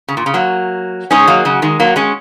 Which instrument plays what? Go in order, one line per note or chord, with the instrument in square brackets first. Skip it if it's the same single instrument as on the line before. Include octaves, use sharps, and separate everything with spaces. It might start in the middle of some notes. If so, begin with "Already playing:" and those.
[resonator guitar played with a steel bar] C#3
A#2
C#3
F#3 A#3
[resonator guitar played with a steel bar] G#3 C#4 [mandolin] D#4 G#4 C#5 G#5
[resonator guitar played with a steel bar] F#3 A#3
C#3 F#3
D#3 G#3
F#3 A#3
G#3 C#4